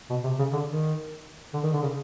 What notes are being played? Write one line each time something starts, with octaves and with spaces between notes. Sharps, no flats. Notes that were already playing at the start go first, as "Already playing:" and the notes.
B2
C3
C#3
D3
D#3
D3
D#3
D3
C#3